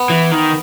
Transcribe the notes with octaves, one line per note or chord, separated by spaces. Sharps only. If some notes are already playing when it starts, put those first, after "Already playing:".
Already playing: B3
E3
D#3